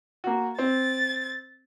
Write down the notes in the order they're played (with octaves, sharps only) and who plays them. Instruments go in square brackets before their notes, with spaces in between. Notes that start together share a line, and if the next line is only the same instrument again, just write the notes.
[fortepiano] A#3 F#4
[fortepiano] C4 [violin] A6